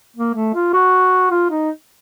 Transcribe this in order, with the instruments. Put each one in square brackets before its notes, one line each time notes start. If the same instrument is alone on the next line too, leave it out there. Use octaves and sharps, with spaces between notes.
[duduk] A#3
A3
F4
F#4
F4
D#4